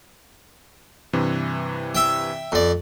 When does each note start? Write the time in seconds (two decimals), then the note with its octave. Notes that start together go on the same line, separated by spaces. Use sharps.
1.13 G2 C3 E3
1.95 E5 G5
2.52 F2 D5